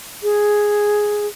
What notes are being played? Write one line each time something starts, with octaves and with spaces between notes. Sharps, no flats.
G#4